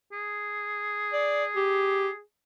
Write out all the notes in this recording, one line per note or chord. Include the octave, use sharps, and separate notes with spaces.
G#4
D5
G4